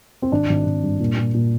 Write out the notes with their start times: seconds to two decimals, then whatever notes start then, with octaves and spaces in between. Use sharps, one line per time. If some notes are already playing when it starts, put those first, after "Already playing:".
0.22 C4
0.32 G#1 D4
0.50 G#1
0.66 G#1
0.83 G2
1.00 A#2
1.17 A#2
1.34 A#2